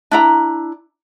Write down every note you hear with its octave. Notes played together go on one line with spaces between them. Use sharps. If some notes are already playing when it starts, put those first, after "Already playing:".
D4 E4 A#5